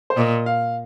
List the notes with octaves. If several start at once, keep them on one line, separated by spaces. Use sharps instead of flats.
C5
A#2 D#5
F5